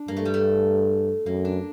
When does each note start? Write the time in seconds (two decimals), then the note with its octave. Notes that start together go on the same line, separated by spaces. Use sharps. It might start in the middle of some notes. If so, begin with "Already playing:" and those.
Already playing: D4
0.08 G2 A#3
0.17 A3
0.25 G3
0.34 A3
1.26 F#2 A#3
1.45 D4